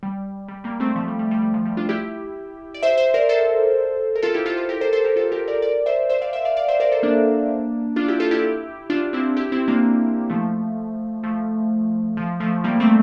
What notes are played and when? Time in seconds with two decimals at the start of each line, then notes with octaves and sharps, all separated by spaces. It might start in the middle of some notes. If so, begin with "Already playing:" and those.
0.03 G3
0.49 G3
0.64 G3 A#3
0.80 A3 C4
0.96 F3 A3
1.08 G3
1.19 G3
1.31 G3
1.42 G3
1.54 F3
1.66 G3
1.77 D4 F4
1.89 E4 G4
2.74 D5
2.83 C5 E5
2.97 C5 E5
3.14 A#4 D5
3.29 A4 C5
4.16 A#4
4.23 F4 A4
4.34 E4 G4
4.46 F4 A4
4.57 F4 A4
4.69 G4 A#4
4.81 A4 C5
4.93 A4 C5
5.04 G4 A#4
5.16 F4 A4
5.32 G4 A#4
5.48 A#4 D5
5.62 A#4 D5
5.86 C5 E5
6.09 C5 E5
6.22 D5 F5
6.33 C5 E5
6.45 D5 F5
6.57 D5 F5
6.68 C5 E5
6.80 A#4 D5
6.92 A4 C5
7.03 A#3 D4
7.96 D4 F4
8.08 E4 G4
8.20 F4 A4
8.31 E4 G4
8.90 D4 F4
9.13 C4 E4
9.37 E4 G4
9.52 C4 E4
9.67 A#3 D4
10.30 F3 A3
11.23 F3 A3
12.17 F3
12.40 F3 A3
12.64 G3 A#3
12.80 A3 C4